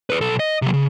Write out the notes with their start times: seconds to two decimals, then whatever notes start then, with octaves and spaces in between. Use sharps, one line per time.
0.10 G#4 B4
0.21 B1 A4
0.39 D#5
0.62 C3 F#3
0.73 C#3